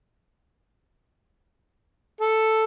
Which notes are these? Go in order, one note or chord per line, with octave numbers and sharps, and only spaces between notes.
A4